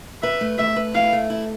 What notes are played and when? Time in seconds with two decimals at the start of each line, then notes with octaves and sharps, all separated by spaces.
0.22 B4 E5
0.41 A3
0.58 A3 E5
0.76 B4
0.95 E4 F5
1.13 A3
1.30 E4